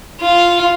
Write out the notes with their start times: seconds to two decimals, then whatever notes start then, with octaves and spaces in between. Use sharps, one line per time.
0.21 F4